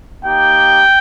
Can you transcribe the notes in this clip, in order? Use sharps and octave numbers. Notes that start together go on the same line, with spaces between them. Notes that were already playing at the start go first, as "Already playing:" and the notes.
A#3 D#4 G4 G5